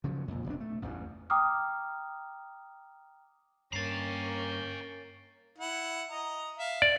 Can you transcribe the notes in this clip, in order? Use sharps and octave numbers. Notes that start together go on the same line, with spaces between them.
C#3 F3 F#3
F2 A#2
E1 C3 D4
A3
A1 E2 G2
G5 A#5 D6 D#6 F6
G2 A#3 C#4 G5 A#5 A6 C7
E4 F#5
D#5 A#5
E5 F5
D5